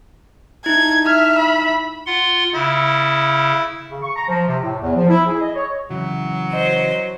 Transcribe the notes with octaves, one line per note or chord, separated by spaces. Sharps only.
D#4 E4 G#6
E5 F6
B5
F4 F#5 C6
C#3 E4
C#3
C#6
A#5
F3
C3
A2
E2
F3
E4
G#4
D#5
C#5
C#3 E3 F#3
C5 D#5